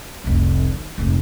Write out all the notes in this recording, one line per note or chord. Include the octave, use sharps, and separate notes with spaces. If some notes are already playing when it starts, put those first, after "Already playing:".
F1 C2
D#3
F1 G#2